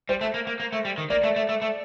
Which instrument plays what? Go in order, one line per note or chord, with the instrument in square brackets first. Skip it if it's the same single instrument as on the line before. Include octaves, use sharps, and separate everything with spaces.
[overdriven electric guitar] G3 [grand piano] C5
[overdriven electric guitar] A3
A#3
A#3
A#3
A3
G3
D#3
[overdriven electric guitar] A#3 [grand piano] D5
[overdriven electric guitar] A3
A3
A3
A3